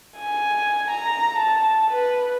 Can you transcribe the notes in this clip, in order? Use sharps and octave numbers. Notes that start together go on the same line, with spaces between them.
G#5
A#5
A5
B4